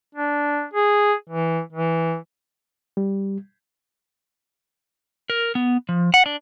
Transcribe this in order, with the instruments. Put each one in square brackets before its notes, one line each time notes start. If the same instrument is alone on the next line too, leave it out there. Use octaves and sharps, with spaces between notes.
[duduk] D4
G#4
E3
E3
[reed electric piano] G3
[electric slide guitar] A#4
B3
F3
F#5
D4